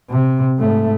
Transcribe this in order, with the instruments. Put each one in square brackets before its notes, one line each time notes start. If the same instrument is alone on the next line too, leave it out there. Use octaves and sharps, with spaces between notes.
[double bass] C3
G#2 A3